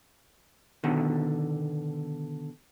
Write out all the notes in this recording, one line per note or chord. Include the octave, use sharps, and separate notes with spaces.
B2 D3 D#3